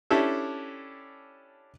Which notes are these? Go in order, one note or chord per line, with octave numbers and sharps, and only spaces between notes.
C#4 D4 E4 G4 A4